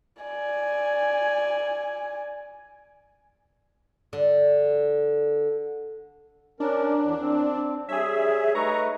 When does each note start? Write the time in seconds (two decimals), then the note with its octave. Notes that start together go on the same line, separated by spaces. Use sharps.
0.22 D5 G#5
4.13 D3
6.60 C#4 D4 A#4
7.01 E2
7.20 C4
7.89 G3 G#4 C#5 E5
8.55 A3 D#4 B4 A#5 C#6